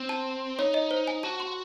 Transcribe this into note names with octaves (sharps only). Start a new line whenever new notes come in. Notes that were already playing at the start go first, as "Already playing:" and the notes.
Already playing: C4
A5
D#4 C#5
D#5
C5
G#5
F#4 A5
C6